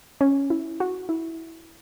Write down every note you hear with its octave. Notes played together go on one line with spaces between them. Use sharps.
C#4
E4
F#4
E4